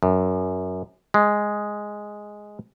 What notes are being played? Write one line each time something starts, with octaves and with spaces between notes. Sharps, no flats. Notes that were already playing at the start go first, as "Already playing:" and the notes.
F#2
G#3